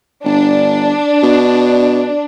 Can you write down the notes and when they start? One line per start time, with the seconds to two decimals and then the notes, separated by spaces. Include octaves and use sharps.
0.25 G1 D4
1.23 B2